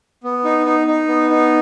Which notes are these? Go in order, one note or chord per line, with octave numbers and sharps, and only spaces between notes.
B3
D#4
D#4
D#4
B3
D#4